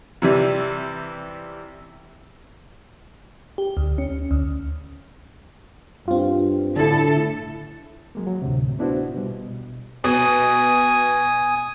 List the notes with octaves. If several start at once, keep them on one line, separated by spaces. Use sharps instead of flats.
C3 E3 G3
G4
D2
C#4
D2
G2 C4 F4
A2 D3 E4 A4
F#3 G#3 A#3
F#3
D2 A2 C3
B3 D4 E4 F#4 C5
B2 G3
B2 G#5 D#6